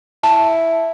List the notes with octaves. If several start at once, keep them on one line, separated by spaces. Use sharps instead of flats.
E4 A5